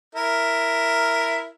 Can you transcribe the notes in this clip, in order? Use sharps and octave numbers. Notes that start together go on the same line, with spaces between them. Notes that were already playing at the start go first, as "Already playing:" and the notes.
E4 A#4